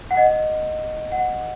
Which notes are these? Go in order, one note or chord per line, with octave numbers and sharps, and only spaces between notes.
F#5
D#5
F#5